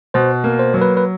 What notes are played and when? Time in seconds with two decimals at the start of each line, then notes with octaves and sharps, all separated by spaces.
0.14 B2 C5
0.44 A#3
0.59 C5
0.74 F#3
0.81 B4
0.97 B4